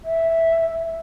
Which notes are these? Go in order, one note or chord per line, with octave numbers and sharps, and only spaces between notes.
E5